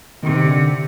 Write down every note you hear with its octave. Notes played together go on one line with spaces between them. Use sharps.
C3 D#3
D3